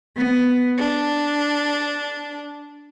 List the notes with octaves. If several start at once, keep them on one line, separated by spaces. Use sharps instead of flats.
B3
D4